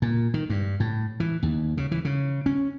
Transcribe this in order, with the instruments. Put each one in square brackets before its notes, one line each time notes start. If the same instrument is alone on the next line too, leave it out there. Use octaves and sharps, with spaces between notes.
[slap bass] A#2
D#3
G2
A2
E3
D#2
C#3
E3
C#3
C#4